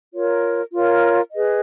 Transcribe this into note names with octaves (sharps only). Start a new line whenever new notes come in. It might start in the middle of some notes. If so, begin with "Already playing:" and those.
F4 A#4 C#5
F4 A#4 C#5
G#4 B4 D#5